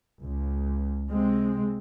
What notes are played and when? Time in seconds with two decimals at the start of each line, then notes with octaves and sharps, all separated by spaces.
0.21 C#2
1.10 C3 G#3 C4